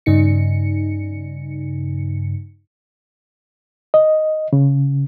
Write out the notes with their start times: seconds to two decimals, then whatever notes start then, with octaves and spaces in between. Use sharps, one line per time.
0.06 G2 C#3 D#4 C#7
3.94 D#5
4.53 C#3